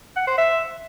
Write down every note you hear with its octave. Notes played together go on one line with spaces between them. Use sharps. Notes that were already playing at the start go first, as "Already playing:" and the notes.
F#5
C5
E5